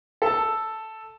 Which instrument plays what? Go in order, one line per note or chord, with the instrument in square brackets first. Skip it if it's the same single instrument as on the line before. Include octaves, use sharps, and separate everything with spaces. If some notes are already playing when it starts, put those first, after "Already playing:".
[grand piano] A4 A5